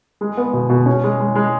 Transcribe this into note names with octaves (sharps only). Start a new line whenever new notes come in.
G#3
B3
B2
B2
C#4
G#3
G#3
G#3